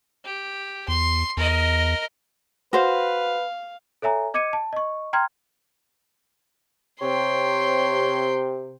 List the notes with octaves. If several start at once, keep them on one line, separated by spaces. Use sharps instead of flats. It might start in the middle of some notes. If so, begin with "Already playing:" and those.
G4
E2 C6
E2 A#4 D#5
F#4 B4 C5 F5
A4 C#5 E5 G#5 A#5
D#5 D6 G#6 C#7 D#7
A5
D#5 C#6
G5 A#5 C6 F6 G#6
C3 C#5 G5 C6